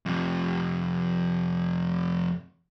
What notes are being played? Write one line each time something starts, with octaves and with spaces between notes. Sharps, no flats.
F2 C3